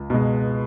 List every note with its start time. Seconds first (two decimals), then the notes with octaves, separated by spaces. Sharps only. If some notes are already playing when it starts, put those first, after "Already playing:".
Already playing: C#2
0.10 B2 G#3